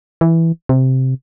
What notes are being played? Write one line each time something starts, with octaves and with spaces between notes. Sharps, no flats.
E3
C3